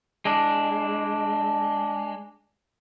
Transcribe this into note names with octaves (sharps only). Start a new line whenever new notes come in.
G#3 D4